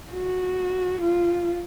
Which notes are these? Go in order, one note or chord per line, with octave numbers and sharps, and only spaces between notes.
F#4
F4